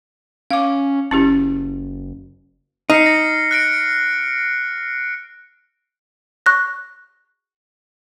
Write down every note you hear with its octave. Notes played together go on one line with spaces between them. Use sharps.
C#4 F5 D6
F#1 C#4 E4 G4
D#4 F6 C7 C#7
A#6
F#6 A#6 D7
C#6 F#6 A#6